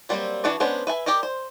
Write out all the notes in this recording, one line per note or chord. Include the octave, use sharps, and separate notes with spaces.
F#3 G3 A#3 C4
E3 D4 F#4 B4 D5
G#3 B3 C#4 D4 C5
B4 E5 G#5
G4 A#4 D5 D#5
C5